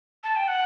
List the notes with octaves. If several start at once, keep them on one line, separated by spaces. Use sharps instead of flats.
A5
G5
F#5